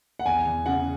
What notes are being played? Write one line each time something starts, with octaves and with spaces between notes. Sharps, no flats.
F#5
E2 G#5
E2
C#3 F#5